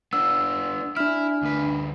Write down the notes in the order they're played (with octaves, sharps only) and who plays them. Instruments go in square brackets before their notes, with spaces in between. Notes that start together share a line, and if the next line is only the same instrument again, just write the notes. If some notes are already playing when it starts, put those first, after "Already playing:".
[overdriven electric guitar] B3 D4 [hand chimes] E6
[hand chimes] D4 F6 [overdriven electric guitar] E4
[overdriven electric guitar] D2 B4